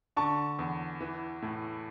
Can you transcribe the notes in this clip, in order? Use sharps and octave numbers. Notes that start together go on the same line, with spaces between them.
D3 A5 C#6
E2
E3
A2